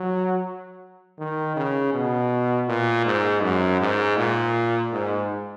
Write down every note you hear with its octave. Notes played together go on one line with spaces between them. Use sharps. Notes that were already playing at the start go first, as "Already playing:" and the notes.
Already playing: F#3
D#3
C#3
B2
A#2
G#2
F#2
G#2
A#2
G#2